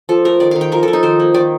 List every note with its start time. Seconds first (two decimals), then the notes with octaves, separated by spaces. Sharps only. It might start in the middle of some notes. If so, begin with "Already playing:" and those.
0.09 F3 A4
0.25 A3 A#4
0.40 D#3 D5
0.51 D#3 F5
0.61 G5
0.72 F3 A#4
0.83 A4
0.88 F3
0.93 D#4
1.03 D#3 C5
1.20 A#3
1.34 D#3 D5